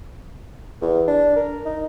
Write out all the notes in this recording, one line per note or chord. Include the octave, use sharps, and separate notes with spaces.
E2
D4
A#4
D#4